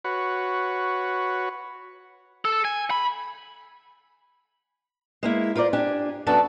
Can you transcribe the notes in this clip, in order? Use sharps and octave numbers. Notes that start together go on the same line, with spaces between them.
F#4 B4 C#5
A4
G#5
B5
G#3 A#3 E4
F4 A#4 C5 D5
D4 G4 G#5
F#2 B3 D4 F#4 A4 A5